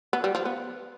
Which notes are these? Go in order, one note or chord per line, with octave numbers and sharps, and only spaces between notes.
B3
G3
F3
B3